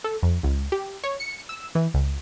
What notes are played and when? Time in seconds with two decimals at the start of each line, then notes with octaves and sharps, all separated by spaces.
0.04 A4
0.23 F2
0.43 C#2
0.72 G4
1.04 C#5
1.20 C#7
1.49 E6
1.75 E3
1.94 C#2